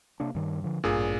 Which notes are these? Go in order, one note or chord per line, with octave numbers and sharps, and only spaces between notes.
C3 A#3 D4
G2 D#3
D3 F3
A1 G2 A#2 D4 G#4